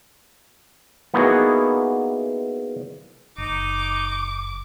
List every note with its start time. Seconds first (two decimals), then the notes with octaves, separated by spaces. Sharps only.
1.14 A#3 B3 D#4 E4 F#4 G#4
3.38 F#1 D#4 D6